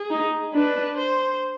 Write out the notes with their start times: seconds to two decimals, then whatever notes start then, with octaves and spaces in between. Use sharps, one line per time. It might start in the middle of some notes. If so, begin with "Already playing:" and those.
Already playing: G#4
0.10 D#4
0.54 D4 B4
0.97 C5